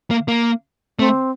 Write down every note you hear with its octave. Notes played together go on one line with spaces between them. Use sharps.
A#3
A#3
A3 C4